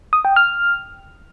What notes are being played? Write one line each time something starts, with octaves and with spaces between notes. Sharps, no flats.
D#6
G5
F6